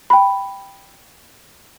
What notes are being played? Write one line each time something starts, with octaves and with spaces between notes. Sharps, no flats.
G5 B5